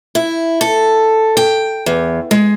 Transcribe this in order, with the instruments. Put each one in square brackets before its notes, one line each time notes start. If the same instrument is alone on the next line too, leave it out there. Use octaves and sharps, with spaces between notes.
[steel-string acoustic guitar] E4
A4
G5
E2
G#3